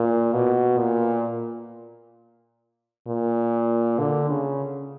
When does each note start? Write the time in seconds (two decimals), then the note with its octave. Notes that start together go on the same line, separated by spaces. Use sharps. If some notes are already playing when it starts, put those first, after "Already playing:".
Already playing: A#2
0.33 B2
0.78 A#2
3.07 A#2
3.99 D3
4.30 C#3